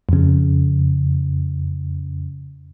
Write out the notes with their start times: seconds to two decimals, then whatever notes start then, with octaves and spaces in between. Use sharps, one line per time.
0.09 F2 C#3